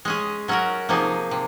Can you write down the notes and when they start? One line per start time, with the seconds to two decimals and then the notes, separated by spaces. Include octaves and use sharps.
0.05 G#3 C#4 G#4
0.48 F#3 C#4 F#4 A#4
0.89 C3 F3 A#3 D#4 G#4
1.31 C3